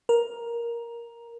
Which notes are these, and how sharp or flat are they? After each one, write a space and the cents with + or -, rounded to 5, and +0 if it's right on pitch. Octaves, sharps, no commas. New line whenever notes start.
A#4 +10